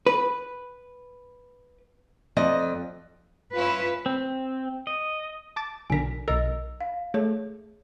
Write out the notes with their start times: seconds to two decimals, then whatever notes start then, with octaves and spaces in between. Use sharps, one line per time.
0.07 B4
2.37 F2 D5 D#5
3.55 C#4 E4 F4 B4
4.06 C4
4.87 D#5
5.56 A5 D6 A6
5.90 B1 D3 A#4 G#5 B6
6.28 B1 A#4 D#5 E6
6.81 F5
7.14 A3 G#4 C#5